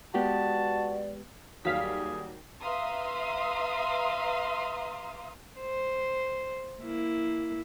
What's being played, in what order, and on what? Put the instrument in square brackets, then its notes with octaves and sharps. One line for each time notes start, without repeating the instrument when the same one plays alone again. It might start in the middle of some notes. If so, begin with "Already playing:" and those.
[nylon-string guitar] G#3 B3 G4 [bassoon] F#4 [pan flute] D5 [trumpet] A5
[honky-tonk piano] D#2 F#3 F#4 [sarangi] G3 [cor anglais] G#4 [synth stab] F5 B6
[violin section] B4 E5 F5 A#5 C6 D#6
[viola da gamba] C5
A#3 E4